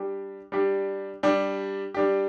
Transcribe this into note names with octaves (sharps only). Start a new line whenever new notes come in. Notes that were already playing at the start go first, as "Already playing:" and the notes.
Already playing: G3 D4 G4
G3 D4 G4
G3 D4 G4
G3 D4 G4